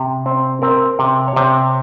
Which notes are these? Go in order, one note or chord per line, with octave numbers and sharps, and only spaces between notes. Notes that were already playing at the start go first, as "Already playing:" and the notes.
Already playing: C3
C4
C4 A#4
C3
C#5
C3 C5